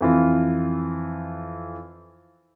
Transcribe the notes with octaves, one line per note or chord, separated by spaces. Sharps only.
F2 E3 F4